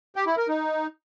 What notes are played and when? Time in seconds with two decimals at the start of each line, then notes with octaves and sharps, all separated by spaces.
0.16 G4
0.27 E4
0.37 A#4
0.48 D#4